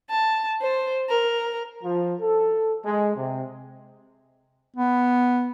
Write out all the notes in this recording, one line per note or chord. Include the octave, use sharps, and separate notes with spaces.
A5
C5
A#4
F3
A4
G#3
C3
B3